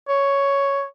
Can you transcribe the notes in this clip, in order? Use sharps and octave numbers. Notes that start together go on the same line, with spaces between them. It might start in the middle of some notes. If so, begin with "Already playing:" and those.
C#5